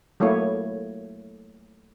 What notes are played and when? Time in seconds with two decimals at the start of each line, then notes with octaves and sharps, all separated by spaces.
0.20 F#3 A3 A#3 E4 C#5